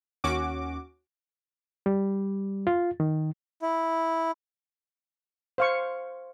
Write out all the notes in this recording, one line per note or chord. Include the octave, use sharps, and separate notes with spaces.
D#2 C#4 F#4 D6
G3
F4
D#3
E4
C5 F5 C#6